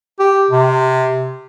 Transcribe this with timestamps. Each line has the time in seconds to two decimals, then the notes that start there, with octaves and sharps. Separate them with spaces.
0.19 G4
0.51 C3